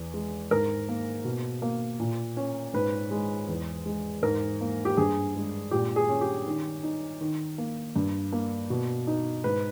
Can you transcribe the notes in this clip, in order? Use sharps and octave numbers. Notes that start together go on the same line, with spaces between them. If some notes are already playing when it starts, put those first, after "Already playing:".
Already playing: E2
G#3
G#2 A#4
A#3
B2
A#3
A#2
C#4
G#2 B4
G#3
E2
G#3
G#2 A#4
A#3
G4
G2 G#4
G#3
A#2 G4
G#4
C#4
G4
D#3
D#4
D#3
A#3
G2
A#3
B2
D#4
G#2 B4